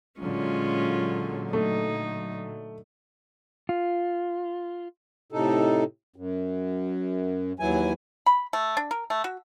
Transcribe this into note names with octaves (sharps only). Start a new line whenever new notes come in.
A#2 D3 F#3 G#3 C#4 F4
A3 D#4
F4
A2 C3 D#4 A4
F#2
D#2 E3 F#3 E4 G#5
B5
A3
D4
A#4
A3
F#4